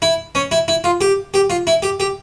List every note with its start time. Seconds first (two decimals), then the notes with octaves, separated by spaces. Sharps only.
0.02 E4
0.35 C#4
0.51 E4
0.68 E4
0.84 F4
1.01 G4
1.34 G4
1.50 F4
1.67 E4
1.82 G4
2.00 G4